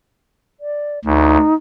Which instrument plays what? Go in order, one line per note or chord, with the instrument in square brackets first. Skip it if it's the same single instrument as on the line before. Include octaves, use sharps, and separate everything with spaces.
[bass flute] D5
[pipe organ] D2 [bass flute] D#4